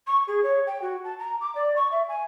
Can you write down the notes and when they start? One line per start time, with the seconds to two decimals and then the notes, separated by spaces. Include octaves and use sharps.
0.07 C#6
0.27 G#4
0.43 C#5
0.67 G5
0.82 F#4
1.04 A5
1.19 A#5
1.41 D6
1.55 D5
1.76 C#6
1.92 E5
2.09 G#5